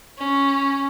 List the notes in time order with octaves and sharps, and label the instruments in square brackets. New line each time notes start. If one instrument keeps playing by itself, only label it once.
[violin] C#4